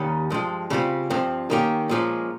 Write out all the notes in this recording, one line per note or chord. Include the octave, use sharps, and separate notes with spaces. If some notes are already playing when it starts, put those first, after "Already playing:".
Already playing: D#2 D#3 G3 C#4
G2 F3 G#3
C#3 G3 C4 F4
G2 F3 C4
D#3 A#3 C#4 G4
A#2 F3 G#3 C#4